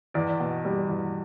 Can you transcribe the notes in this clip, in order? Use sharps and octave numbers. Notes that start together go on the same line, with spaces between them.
E2 D5
B2
G3
E2